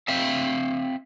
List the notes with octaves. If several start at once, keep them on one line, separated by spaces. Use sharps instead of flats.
C4 E5 F5